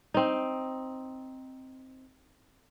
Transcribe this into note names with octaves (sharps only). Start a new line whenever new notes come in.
C4 D#4